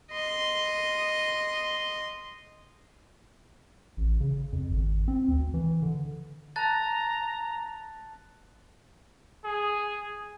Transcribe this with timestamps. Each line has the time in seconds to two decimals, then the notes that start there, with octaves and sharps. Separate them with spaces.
0.12 D#5 C6
3.97 A1
4.20 C#3
4.52 F2
4.70 G#1
5.08 C4
5.28 D2
5.54 E3
5.82 D3
6.56 A5 A#5 F#6 A6
9.45 G#4